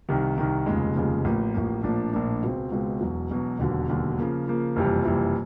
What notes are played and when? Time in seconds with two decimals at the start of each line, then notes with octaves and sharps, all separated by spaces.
0.09 C2 C3 D#3
0.38 C2 C3 D#3
0.66 F1 D#2 C#3 F3 G#3
0.96 F1 D#2 C#3 F3 G#3
1.25 A1 A2 F3 A#3
1.54 A1 A2 F3 A#3
1.83 A#1 A2 F3 A#3 D4
2.13 A#1 A2 F3 A#3 D4
2.42 C#2 B2 G#3 C4
2.72 C#2 B2 G#3 C4
3.00 E1 E2 B2 F#3
3.30 E1 E2 B2 F#3
3.59 E1 D#2 D3 F#3
3.88 E1 D#2 D3 F#3
4.18 C#3 F3 A#3
4.47 C#3 F3 A#3
4.76 F#1 F2 C3 E3 G3
5.05 F#1 F2 C3 E3 G3